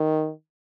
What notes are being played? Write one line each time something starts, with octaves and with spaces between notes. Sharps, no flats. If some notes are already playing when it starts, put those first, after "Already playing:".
Already playing: D#3